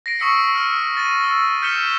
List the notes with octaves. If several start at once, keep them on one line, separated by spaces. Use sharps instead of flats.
A#6 C7 D7
C#6 D#6 E6 B6 C#7 D7
E6 F6 D#7
A6 D#7
E6
F6 G6 B6 C#7 E7 G7